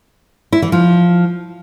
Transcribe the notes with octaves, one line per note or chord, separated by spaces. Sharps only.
E4
E3
F3